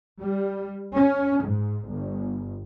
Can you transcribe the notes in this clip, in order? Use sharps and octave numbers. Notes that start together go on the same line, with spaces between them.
G3
C#4
G#2
G1